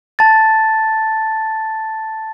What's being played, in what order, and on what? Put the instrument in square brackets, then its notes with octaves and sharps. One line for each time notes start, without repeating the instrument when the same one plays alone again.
[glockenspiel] A5 A6